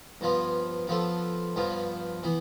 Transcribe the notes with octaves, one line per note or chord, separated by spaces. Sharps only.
G2 F3 B3 F4
F3 B3 F4 A4
G2 F3 B3 F4
E3 B3